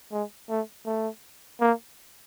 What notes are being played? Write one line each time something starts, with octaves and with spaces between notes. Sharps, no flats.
G#3
A3
A3
A#3